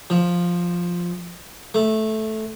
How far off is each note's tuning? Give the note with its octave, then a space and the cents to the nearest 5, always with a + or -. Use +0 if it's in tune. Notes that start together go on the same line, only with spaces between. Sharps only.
F3 +5
A3 -10